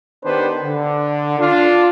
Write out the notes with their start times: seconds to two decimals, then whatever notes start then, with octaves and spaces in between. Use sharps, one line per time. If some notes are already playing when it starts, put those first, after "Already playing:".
0.24 D#3 B3 D4 G4 B4 C5
0.61 D3
1.39 D4 F4